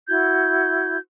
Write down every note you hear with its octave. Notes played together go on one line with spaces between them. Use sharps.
E4 F#4 G6 G#6